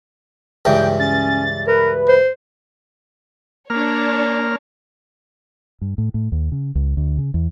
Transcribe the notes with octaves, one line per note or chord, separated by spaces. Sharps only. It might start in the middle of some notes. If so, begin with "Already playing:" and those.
C#2 G2 E3 G5
C#4 A6
A#4 B4
C5
A#3 D4 C#5 F6
G2
A2
A2
D#2
C#3
C#2
D2
C#3
E2